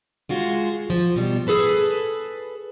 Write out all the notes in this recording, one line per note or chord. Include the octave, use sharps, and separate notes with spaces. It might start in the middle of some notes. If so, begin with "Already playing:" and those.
G#3 F4 F#4 G#4
F3
B2 G3
G#4 A4 B4 A5